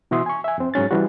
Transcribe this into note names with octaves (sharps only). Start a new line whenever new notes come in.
B2 E3 F#4 E5 C6 D#6
G#5 C#6
E5 G#5
F2 C4
G#2 F#3 C#4 A6
E3 G3 F#4